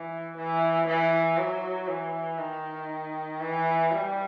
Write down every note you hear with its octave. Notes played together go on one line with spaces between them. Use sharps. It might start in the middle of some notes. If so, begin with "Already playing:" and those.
Already playing: E3
E3
E3
F#3
E3
D#3
E3
G3